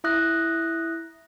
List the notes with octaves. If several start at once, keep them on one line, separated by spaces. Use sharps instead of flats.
E4 E5 D#6 F#6 A#6